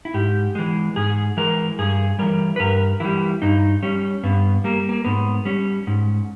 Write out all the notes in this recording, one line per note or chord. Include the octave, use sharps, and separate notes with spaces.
E4
G#2 G4
E3 G#3
G#2 G#4
E3 G#3 A#4
G2 G#4
E3 G3 A#4
B4
G2 A#4
E3 G3 E4
G2 D#4
G3 C#4
G2 B3
G3 A#3
A#3
G#2 B3
G3 C#4
G#2